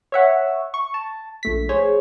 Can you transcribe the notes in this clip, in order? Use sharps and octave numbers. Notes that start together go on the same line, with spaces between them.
C#5 E5 F#5
C#6
A5
A#1 A3 B6
G#4 C5 C#5